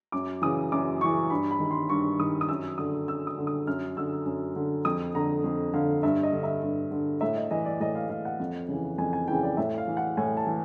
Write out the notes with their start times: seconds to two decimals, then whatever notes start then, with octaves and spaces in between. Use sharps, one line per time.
0.12 F#2 D6
0.42 C#3 E3 D#6
0.72 F#2 D6
1.01 C#3 E3 C#6
1.30 G2 B5
1.51 B5
1.60 D#3
1.71 C6
1.89 G2 C#6
2.19 D#3 D#6
2.41 D#6
2.49 F#2 E6
2.78 D3 D#6
3.07 F#2 E6
3.27 D#6
3.38 D3
3.47 D#6
3.67 F#2 F6
3.97 D3 E6
4.25 F#2
4.56 D3
4.85 F2 D#6
5.15 D3 A#5
5.44 F2
5.74 D3 F5
6.03 G2 E5
6.23 D#5
6.33 D3
6.43 E5
6.63 G2
6.91 D3
7.21 A2 E5
7.36 D#5
7.51 E3 D#5
7.65 D5
7.80 A2 D#5
7.95 F5
8.09 E3 F5
8.25 F#5
8.40 F2
8.68 C#3 E3
8.98 F2 G#5
9.13 G#5
9.28 C#3 E3 G5
9.43 D5
9.57 A2 E5
9.78 F5
9.88 E3
9.97 F#5
10.17 A2 G#5
10.37 A5
10.47 E3